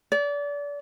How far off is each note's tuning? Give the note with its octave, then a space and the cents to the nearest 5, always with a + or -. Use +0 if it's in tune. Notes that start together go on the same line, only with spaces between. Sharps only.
D5 -30